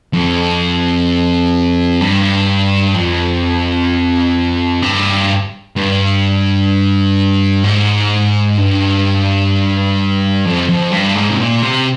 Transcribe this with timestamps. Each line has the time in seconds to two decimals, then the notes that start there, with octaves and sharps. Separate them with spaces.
0.13 F2
2.01 G2
2.94 F2
4.82 G2
5.76 G2
7.64 G#2
8.58 G2
10.45 F2
10.69 F2
10.92 G2
11.16 G#2
11.31 C3
11.40 A#2
11.63 C3